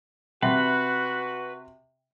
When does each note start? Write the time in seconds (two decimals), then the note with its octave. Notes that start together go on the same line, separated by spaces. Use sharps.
0.43 C3 F#4 B4 E5 F#5 G5